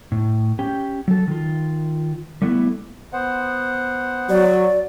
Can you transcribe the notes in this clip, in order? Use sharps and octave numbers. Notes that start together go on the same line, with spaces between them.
A2
C#4 G4 G5
F#3 A4
D#3 F4
G3 A3 B3 E4
B3 C5 F#5
F#3 D5